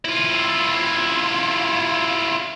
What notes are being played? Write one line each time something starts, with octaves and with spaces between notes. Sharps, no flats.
E4 F4